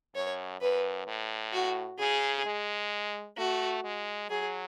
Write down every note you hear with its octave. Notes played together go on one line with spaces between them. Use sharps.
F#2 C#5
F#2 B4
A2
F#4
C#3 G#4
G#3
A3 F#4
G#3
F#3 G#4